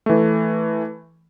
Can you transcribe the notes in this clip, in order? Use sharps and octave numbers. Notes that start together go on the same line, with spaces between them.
E3 A3